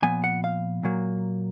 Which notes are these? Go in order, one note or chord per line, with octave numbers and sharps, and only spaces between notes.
A#2 F3 B3 G#5
F#5
F5
A#2 F#3 A#3